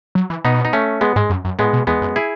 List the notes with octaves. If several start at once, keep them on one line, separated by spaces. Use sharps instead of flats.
F#3
E3
B2 B3 D#4
D#4
A3 C#4
G#3 B3
G#2 G#3
F#2
F#2
A2 G#3 B3
B2
E2 G#3 B3
F#2
E4 G#4